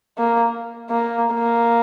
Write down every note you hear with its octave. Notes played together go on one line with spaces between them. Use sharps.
A#3
A#3
A#3